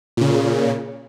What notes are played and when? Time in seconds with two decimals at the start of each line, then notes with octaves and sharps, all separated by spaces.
0.17 A#2 C#3